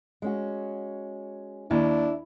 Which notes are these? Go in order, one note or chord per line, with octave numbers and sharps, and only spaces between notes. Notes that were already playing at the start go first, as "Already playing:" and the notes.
G#3 C#4 F#4
D#2 D4 E4